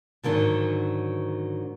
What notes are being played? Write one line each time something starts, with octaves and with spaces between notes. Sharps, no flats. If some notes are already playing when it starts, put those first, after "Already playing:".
G#2 D3 D#3 F3 F#3